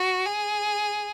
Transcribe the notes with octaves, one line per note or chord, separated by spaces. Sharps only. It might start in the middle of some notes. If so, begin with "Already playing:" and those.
Already playing: F#4
G#4